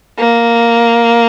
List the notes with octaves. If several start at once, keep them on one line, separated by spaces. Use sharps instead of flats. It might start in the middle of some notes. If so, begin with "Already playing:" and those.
A#3